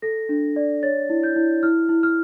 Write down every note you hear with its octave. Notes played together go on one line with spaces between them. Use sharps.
A4 A#6
D4
D5
C#5 A6
E4
G6
E4
E4 F6
E4
F6